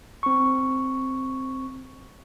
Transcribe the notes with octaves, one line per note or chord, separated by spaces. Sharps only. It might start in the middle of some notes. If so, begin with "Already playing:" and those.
C4 C#6